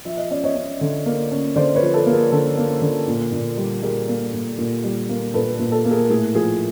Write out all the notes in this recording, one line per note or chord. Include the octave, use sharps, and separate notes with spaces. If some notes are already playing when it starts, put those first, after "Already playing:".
F3 E5
D#5
C#4 D5
C#5 D#5
C#4
D3
A#3
C#4
D3 C5 D5
B4 C#5
F3
A4 B4
A#3
G#4 A#4
D3 A4
A#3
D3
A#2
A#2
G3
G3 G#4 A#4
A#3
A#2
A#2
G3
A#3
A#2 A4 B4
A#2
A4
A#3
G#4 A#4
A2 G#4
F3 G#4